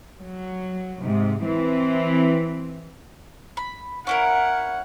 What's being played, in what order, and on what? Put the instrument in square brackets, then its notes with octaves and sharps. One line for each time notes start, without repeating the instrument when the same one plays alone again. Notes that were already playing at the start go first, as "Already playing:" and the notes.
[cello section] F#3
G#2 C3
E3 C4
[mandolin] B5
[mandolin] C#4 E4 A#4 [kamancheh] F#5